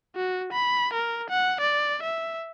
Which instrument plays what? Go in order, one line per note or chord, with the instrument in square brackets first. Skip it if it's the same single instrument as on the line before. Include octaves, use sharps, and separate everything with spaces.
[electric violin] F#4
B5
A#4
F#5
D5
E5